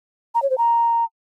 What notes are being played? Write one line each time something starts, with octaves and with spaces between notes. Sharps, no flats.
A#5
C#5
C5
A#5